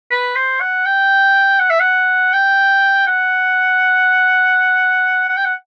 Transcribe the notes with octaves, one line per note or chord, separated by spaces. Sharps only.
B4
C5
F#5
G5
F#5
E5
F#5
G5
F#5
F#5
G5
F#5